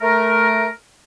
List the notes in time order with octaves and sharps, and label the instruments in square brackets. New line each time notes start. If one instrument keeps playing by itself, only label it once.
[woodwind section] A3 A#4